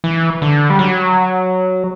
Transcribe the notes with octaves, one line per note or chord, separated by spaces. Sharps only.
E3
D3
G3
F#3